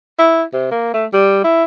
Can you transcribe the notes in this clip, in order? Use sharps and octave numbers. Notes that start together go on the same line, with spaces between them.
E4
C3
A#3
A3
G3
E4